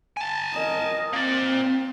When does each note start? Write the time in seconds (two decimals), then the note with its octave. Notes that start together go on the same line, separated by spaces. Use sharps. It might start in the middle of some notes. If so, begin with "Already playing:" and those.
0.17 G#5 A5
0.55 A#4 D#5
1.13 A#3 C4 D5